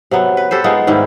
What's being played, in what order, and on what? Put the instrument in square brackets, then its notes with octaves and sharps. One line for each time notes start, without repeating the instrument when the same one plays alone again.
[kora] C3 F#3 B3
B4
G4 A4 B4 C5
G#3 B3 D#4 F4
G#2 D#3 G3 E4